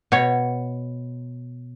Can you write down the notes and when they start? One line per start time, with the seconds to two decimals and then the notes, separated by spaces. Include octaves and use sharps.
0.12 B2 C#5